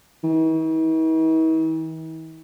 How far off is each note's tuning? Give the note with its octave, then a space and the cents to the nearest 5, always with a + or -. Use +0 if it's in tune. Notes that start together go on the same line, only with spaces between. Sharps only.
E3 -45